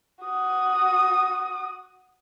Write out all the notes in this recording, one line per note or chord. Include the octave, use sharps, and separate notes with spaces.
F#4 D#6